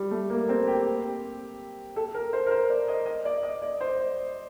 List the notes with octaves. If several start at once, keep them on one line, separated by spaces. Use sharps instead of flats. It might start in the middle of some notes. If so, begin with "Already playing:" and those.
Already playing: G3
A3
A#3
C4
G4
A4
A#4
C5
A#4
C5
D5
D#5
D#5
D5
D#5
D5
C5
D5